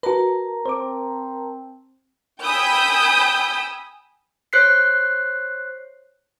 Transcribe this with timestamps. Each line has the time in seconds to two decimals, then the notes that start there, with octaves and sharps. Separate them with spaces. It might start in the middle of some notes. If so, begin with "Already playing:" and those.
0.03 F#4 A#4 B4 A5 A#5
0.66 C4 C5 D6
2.44 G5 G#5 B5 D#6 E6 G6
4.53 C5 C#5 F#6 G6 B6 C7